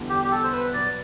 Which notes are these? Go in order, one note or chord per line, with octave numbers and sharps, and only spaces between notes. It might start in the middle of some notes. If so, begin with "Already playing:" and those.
Already playing: E2 D3 G3
G4
G4
A4
C5
B4
B2 F#3 B3 F#4 D5